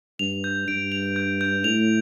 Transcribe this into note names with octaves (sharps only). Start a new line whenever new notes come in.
G2 F7
G6
G2 D7
F7
G6
G6
A2 F7